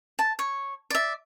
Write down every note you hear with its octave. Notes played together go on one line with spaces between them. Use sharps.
A5
C#5
D5 E5